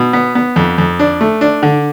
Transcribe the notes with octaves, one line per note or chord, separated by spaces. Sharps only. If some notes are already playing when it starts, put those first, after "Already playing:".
Already playing: B2
B3
B3
F2
F2
D4
A3
D4
D3